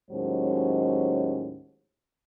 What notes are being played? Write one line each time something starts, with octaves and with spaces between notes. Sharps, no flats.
D#2 A2 F#3 G#3 C#4 C5